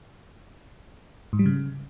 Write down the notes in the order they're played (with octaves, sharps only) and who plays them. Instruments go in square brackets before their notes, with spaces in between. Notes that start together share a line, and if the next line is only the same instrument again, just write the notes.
[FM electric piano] G#2
G3
C#3